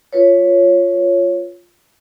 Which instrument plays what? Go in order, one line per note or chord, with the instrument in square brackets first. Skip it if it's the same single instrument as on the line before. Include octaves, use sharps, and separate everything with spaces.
[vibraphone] F4 B4 C#5